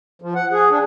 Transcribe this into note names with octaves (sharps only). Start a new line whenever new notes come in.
F3
F#5
G#4
D4